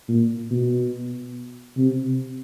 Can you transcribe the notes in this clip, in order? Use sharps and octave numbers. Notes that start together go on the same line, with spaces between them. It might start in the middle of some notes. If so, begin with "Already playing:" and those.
A#2
B2
C3